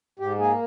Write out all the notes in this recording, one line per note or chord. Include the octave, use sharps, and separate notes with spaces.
G#2 G4
A#3 G#4